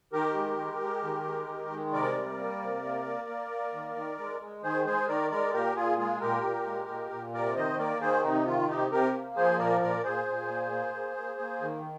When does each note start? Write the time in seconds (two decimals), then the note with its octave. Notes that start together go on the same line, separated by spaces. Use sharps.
0.13 D#3 G4 A#4
0.35 G#3
0.57 G#3
0.81 G#3
1.03 D#3
1.25 G#3
1.48 D#3
1.70 G#3
1.93 C3 A#4 D5
2.15 G3
2.38 A#3
2.61 C3
2.83 A#3
3.05 A#3
3.29 A#3
3.50 A#3
3.73 D#3
3.95 D#3
4.18 G#3
4.40 G#3
4.63 D#3 G#4 C5
4.85 G#3 G#4 C5
5.08 D#3 A#4 D5
5.31 G#3 A#4 D5
5.53 A#2 G4 A#4
5.76 A#2 F4 G#4
5.98 G#3 F4 G#4
6.20 A#2 G4 A#4
6.43 A#2
6.66 G#3
6.89 A#2
7.11 A#2
7.33 C3 A#4 D5
7.56 D#3 C5 D#5
7.78 A#3 A#4 D5
8.01 D#3 G#4 C5
8.23 C3 D#4
8.46 D#3 F4
8.69 C3 D#4 G4
8.91 C3 G4 A#4
9.14 A#3
9.36 F3 G#4 C5
9.58 A#2 A#4 D5
9.81 A#2 A#4 D5
10.04 A#2 G#4 C5
10.27 A#2
10.48 A#3
10.71 A#3
10.94 A#3
11.17 A#3
11.39 A#3
11.61 D#3